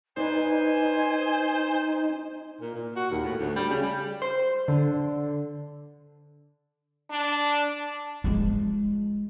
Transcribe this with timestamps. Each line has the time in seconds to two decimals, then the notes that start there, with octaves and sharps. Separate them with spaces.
0.17 D#4 B4 C5 D5 G#5
2.61 A#2
2.74 A#2
2.96 F#4
3.11 D#2
3.23 A2
3.38 D2
3.56 G3
3.70 C#3
3.82 G3
4.22 C5
4.68 D3
7.11 D4
8.24 F3 G#3